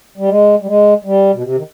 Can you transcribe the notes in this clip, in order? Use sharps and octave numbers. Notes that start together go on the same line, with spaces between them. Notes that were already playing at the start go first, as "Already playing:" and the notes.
G3
G#3
G3
G#3
G3
B2
C3
D#3